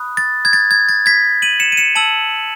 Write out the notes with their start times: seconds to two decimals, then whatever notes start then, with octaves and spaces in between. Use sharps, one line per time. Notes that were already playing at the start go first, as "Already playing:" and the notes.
Already playing: B5 D#6 F#6
0.17 A6
0.45 G#6
0.53 A6
0.71 G#6
0.89 A6
1.06 G#6 B6
1.42 D#7 F#7
1.60 C#7 E7
1.72 D#7
1.77 C#7 E7
1.95 A5 E6 D#7 F#7